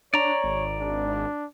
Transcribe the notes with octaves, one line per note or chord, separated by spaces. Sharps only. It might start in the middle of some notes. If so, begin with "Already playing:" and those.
D4 C#5 D5 A#5
G#1
D4